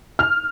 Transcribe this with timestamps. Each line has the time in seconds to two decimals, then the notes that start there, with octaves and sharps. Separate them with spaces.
0.19 F6